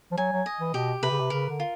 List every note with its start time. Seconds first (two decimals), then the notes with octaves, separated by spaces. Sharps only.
0.11 F3
0.17 F#3 G#5
0.32 F#3
0.46 D#5
0.60 E3
0.74 B2 G4
1.03 C3 B4
1.11 C#3
1.20 C3
1.30 C#3 A#4
1.49 D3
1.60 F4